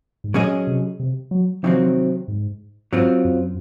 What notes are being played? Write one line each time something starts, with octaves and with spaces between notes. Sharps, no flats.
G#2
A#2 F#3 C#4 G#4 D#5
C3
C3
F#3
C3 D#3 F3 F#3 C4
G#2
G#2 F#3 C4 F4
F#2